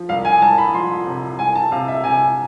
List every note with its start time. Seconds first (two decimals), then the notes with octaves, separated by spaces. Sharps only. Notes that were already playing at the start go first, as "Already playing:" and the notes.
Already playing: F3
0.09 C2 F5
0.25 G#5
0.42 C2 A5
0.58 B5
0.74 F3 C6
1.06 C3
1.39 C2 G#5
1.55 A5
1.72 C3 F5
1.88 E5
2.04 C3 G#5